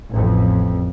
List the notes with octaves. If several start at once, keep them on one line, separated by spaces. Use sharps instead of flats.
A1 F2